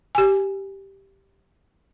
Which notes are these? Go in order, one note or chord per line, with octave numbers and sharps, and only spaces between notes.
G4 G#5